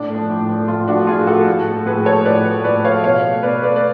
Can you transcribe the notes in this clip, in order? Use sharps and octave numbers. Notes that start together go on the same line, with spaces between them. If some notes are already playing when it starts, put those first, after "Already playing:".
Already playing: A2 D4
F3 A3
A2
F3 A3
A2 F4
F3 A3 D4 F#4
A2 F4 G#4
F3 A3 F#4 A4
A2
F3 A3
A2 G#4 B4
F3 A3 A4 C#5
A2 B4 D5
F3 A3
A2 B4 D5
F3 A3 C#5 F5
B2 C#5 F5
A3
B2 B4 D5
A3 B4 D5
D5